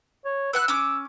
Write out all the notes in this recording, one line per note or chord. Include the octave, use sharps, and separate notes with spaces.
C#5
B4 F#5 E6 F#6
C#4 D6